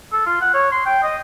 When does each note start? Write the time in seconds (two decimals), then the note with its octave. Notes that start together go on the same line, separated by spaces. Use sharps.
0.12 A4
0.26 F4
0.41 F#5
0.54 C#5
0.72 C6
0.86 G5
1.03 D#5